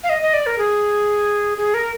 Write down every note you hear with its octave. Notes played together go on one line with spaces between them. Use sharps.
F5
D#5
D#5
D5
A#4
G#4
G#4
A#4